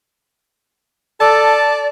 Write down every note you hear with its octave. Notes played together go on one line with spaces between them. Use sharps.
A4 D5 A5